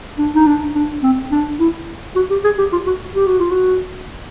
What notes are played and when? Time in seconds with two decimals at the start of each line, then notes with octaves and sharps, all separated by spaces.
0.18 D4
0.35 D#4
0.46 D4
0.75 D4
1.03 C4
1.31 D4
1.60 E4
2.16 F#4
2.30 G4
2.44 G#4
2.58 G4
2.72 F4
2.87 F#4
3.15 G4
3.27 F#4
3.39 F4
3.51 F#4